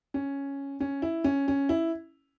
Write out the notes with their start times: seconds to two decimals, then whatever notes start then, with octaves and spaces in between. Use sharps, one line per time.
0.14 C#4
0.80 C#4
1.02 E4
1.24 C#4
1.48 C#4
1.69 E4